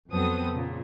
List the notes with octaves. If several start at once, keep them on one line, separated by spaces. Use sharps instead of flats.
F2 F#3 B3 C4 A4 D#6
A#2 C#3